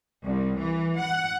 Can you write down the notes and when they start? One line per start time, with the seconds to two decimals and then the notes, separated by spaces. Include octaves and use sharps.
0.24 C2
0.59 E3
1.00 F#5